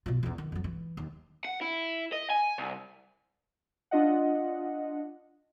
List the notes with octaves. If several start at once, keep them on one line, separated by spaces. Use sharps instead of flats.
B2 F4
E2 C#4
D#3
F2 F#3
E3
D#2
F#5
E4
D#5
G#5
C2
D4 F4 D#5 F#5